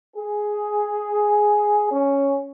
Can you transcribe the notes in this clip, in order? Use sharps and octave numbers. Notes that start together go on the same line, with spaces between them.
G#4
C#4